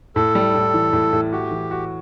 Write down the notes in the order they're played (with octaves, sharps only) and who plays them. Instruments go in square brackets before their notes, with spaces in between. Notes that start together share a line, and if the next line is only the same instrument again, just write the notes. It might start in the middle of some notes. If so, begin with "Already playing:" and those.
[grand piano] A2 [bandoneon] A4
[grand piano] G3
A2
E3
A2
A2
[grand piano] F#4 [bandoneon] G4
[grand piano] E3
F#4